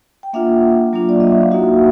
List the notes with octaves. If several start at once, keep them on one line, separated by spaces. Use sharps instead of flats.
G5
A#3 D4 F4 E5 F#5
F#3 A#3 D4 F4
D5
D#5
E5
F5
A#3 D#4 F#4 E5 F#5